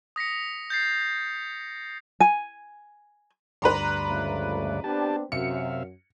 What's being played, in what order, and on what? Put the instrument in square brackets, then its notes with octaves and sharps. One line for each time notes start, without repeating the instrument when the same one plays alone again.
[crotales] D#6 A#6 B6 C#7
G6 A6 C7
[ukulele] G#5
[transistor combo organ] D2 G2 D5 [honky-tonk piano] B4 A#5 C6
[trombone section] C#2 F3 A3
[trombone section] B3 C4 D4 [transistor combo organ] G4 A5
[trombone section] F#2 [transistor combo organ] C3 E5 F5 [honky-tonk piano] C#7